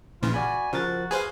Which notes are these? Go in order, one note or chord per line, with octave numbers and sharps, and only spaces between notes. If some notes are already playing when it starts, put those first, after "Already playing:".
A#1 A#2 C#3 E3 F4
F#4 D5 G#5 B5
C#3 F3 F#4 A#4 A6
G#4 B4 C5 F5 G#5